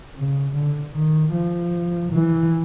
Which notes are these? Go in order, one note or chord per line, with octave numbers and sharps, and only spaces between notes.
C#3
D3
D#3
F3
E3